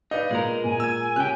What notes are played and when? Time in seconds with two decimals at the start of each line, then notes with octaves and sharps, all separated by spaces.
0.11 D#4 B4 D5 D#5 F5
0.31 A#2 G#3 A#4
0.64 A#2 G#5
0.80 E6 G#6
1.16 C#3 G4 G5 F#6